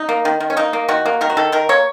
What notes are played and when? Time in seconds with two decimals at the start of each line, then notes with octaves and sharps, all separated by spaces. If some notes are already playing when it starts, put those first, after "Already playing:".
Already playing: D#4
0.09 A#3
0.25 D#3
0.40 D#3
0.50 C#4
0.57 A#3 D#4
0.73 A#3
0.88 D#3 F#4
1.06 A#3
1.21 D#3 A#4
1.30 F#4
1.37 D#3 A4
1.52 D#3 A#4
1.69 A#3 C#5